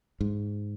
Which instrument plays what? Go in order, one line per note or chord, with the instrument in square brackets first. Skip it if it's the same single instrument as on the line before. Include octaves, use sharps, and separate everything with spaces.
[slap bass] G#2